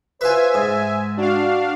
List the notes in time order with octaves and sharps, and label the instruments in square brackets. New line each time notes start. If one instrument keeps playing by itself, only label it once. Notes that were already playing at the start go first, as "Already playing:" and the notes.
[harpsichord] F4 B4 [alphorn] C5 [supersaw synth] E5 G#5
[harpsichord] G#2
[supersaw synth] D4 F5 [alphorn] F#4